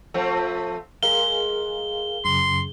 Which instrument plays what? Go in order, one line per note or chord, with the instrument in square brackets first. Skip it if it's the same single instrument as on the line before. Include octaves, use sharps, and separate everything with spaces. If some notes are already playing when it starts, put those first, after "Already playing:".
[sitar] F3 A3 C4
[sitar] G#3 [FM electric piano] G#4 A#4 F5 [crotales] G7
[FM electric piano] F#2 C#3 [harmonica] C6